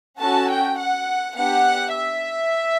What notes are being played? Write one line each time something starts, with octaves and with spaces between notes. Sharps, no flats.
C#4 F#4 A4 A5
G5
F#5
B3 D4 G4 F#5
E5